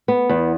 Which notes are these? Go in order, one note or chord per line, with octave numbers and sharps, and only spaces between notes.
B3
E2